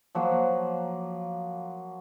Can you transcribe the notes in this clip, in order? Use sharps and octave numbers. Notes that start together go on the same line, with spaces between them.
F3 F#3 A#3